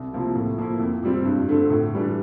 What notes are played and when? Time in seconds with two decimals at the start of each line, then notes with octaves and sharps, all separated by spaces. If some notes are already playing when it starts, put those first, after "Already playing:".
Already playing: C2
0.12 C3 F3 A#3 E4
0.35 A2
0.58 F3 A#3 E4
0.79 F2
1.03 C3 G3 C4 E4
1.25 G2
1.49 D3 A3 C4
1.70 A2
1.94 E3 G3 D4